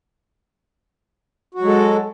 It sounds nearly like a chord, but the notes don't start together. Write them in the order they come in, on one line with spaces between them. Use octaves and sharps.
F#4 F#3 G#3 A4